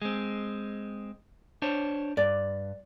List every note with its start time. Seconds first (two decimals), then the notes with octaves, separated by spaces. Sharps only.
0.02 G#3 C4
1.62 D4 C5 C#5
2.17 G2 D5